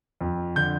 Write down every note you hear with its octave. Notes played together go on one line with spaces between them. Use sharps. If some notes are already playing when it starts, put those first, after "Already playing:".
F2
D3 G6